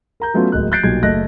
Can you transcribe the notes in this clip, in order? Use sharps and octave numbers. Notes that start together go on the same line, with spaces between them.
A#4 A#5 G6
F#3 A3 B3 C#4 F4 F#4
D1 G#3 A#3 F#6
F#6 G6 A6 C7 D7
B1 A#2 G3 G#6
F#1 A3 D#5 F#6 A#6